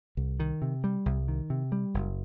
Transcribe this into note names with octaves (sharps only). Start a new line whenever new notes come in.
C2
D#3
C3
G3
C2
D#3
C3
G3
F#1